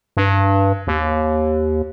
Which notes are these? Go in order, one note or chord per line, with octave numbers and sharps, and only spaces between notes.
G2
D#2